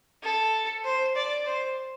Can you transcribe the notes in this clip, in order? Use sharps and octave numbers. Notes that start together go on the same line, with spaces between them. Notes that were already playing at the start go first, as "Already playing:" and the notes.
A4
C5
D5
C5